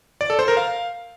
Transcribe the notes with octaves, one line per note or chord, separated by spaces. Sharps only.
D5
A4
C5
A#4
F5